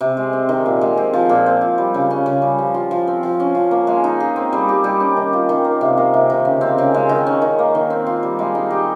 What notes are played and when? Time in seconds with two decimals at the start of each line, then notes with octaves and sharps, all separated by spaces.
0.01 C3
0.17 G#3
0.33 C4
0.49 D#3
0.66 A#2
0.81 G#3
0.97 C4
1.13 F3
1.29 A#2
1.46 C4
1.61 F4
1.78 G3
1.94 C#3
2.10 C#4
2.26 C#3
2.42 G3
2.58 F3
2.74 F4
2.91 F3
3.07 C4
3.23 F3
3.40 C#4
3.55 F3
3.71 A#3
3.87 G#3
4.04 D#4
4.20 G#4
4.36 C4
4.53 G3
4.69 G4
4.84 G3
5.00 C#4
5.17 D#3
5.33 F4
5.49 D#3
5.64 A#3
5.81 C3
5.98 A#3
6.14 C3
6.30 D#3
6.45 C#3
6.61 C4
6.78 C#3
6.94 G#3
7.09 D#3
7.26 C#4
7.42 D#3
7.59 A#3
7.75 D#3
7.90 C4
8.07 F4
8.23 G3
8.39 G#3
8.55 D#4
8.71 G4